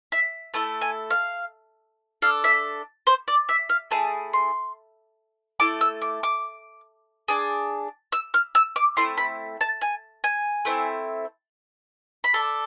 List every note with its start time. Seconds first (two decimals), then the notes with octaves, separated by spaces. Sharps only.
0.12 E5
0.54 A3 E4 A4 A5
0.81 G#5
1.11 F5
2.22 D4 A4 F5
2.44 E5
3.07 C5
3.28 D5
3.49 E5
3.69 F5
3.91 A3 E4 G#4 A5
4.33 C6
5.60 A3 E4 A4 D6
5.81 E6
6.02 D6
6.23 D6
7.28 D4 G#4
8.12 E6
8.34 F6
8.55 E6
8.76 D6
8.97 A3 C4 E4 C6
9.18 B5
9.61 A5
9.81 G#5
10.24 G#5
10.65 A3 C4 E4
12.24 B5
12.34 D4 A4 A5